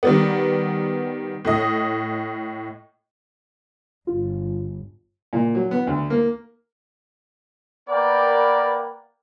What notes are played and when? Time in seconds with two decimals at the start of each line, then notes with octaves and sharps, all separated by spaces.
0.03 D#3 G3 B3
1.45 A2 D#5
4.07 G1 F4
5.33 A#2
5.55 F#3
5.71 B3
5.87 D2
6.10 A#3
7.88 A#3 B3 A#4 B4 D5 G5